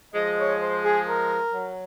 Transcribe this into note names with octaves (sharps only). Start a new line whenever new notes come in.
F3 G#3 D#5
C#5
C5
G#4
A#4
F#3